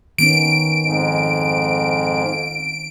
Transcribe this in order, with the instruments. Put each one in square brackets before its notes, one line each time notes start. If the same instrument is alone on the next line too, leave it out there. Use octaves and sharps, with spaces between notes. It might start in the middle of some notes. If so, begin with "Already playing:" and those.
[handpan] D#3 B3 C#4 [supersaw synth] D7
[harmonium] F2 G#2